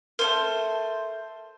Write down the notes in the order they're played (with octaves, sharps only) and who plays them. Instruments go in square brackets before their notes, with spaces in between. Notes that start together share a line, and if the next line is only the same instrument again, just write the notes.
[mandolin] A3 C#4 C5 [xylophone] A#4